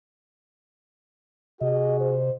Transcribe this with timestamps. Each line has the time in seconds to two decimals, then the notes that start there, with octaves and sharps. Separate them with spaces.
1.61 C3 F#4 G#4 D#5
2.00 C5